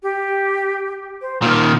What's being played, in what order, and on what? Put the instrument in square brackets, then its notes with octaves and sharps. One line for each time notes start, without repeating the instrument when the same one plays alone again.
[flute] G4
C5
[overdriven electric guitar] A#2 D#3 [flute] F6